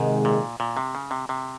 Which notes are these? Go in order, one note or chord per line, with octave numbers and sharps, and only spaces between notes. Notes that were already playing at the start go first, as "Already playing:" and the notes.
Already playing: G#2 C3 D#3 G#3
A#2
A#2
C3
C#3
C3
C3